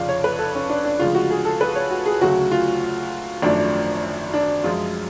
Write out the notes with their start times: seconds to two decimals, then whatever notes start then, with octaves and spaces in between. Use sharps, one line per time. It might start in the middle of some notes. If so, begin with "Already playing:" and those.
Already playing: F1 F2 C#3 F3 D5 F5
0.09 C#5
0.24 B4
0.39 A4
0.55 C#4
0.70 D4
0.85 D4
1.00 D2 C#3 F3 G#3 F4
1.15 F#4
1.30 G#4
1.45 A4
1.61 B4
1.76 C#5
1.91 F#4
2.06 G#4
2.21 D2 C#3 F#3 A3 F#4
2.52 F4
3.42 G#1 F#2 F3 A3 D4
4.34 D4
4.64 F#2 F3 G#3 F4